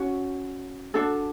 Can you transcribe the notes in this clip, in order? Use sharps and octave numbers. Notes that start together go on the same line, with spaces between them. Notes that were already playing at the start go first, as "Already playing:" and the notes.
Already playing: C#4 F#4
D4 F#4 A4